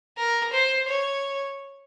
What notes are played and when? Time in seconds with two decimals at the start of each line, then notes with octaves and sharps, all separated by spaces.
0.18 A#4
0.53 C5
0.89 C#5